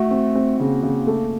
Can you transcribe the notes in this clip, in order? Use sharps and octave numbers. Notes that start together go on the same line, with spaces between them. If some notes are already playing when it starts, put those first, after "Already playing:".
Already playing: A3 F#4
C4
C4
C#3 A#3
C#3
A3